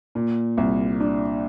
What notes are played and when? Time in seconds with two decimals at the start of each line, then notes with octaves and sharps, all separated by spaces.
0.15 A#2
0.58 C2
1.00 D4